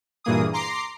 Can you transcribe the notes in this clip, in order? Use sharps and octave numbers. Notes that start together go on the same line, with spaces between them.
G2 A#2 E3 A#3 G#4 D#6
A#5 C6 D6 C7